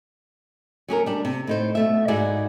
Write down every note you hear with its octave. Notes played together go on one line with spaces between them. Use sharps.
F#3 C#4 G#4 A#4
G3 D4
C3
A2 D#4 C5
B2 A3 E5
G#2 D#4 E4 F#4 G#4 D5